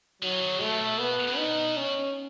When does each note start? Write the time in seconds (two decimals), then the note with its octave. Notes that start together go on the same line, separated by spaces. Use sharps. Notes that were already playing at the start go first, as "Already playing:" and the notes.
0.22 D#3 F#3
0.32 E3
0.42 D#3
0.51 C#3
0.60 B2 A3
1.00 B3
1.28 C#3
1.37 B2 D#4
1.77 C#4